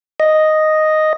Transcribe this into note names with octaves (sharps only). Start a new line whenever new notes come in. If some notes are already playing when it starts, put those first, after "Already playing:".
D#5